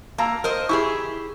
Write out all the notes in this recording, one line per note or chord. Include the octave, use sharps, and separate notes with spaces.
A#3 A5 A#5 E6
A#4 C5 D#5
E4 G4 G#4 C#6